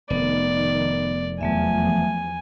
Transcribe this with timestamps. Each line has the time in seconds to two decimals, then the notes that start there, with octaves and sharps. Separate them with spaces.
0.10 F1 D#3 B3 D5
1.41 E2 F3 F#3 A3 E5 G#5